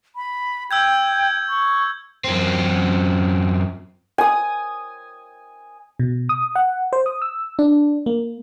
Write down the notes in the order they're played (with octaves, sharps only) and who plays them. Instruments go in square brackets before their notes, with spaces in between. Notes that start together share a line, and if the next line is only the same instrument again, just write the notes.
[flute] B5
[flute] G5 [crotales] E6 G6 G#6
[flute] C#6
[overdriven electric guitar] F#2 C4
[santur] G#5 D#6
[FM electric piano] B2
D#6
F#5
C5
D#6
E6
D4
A#3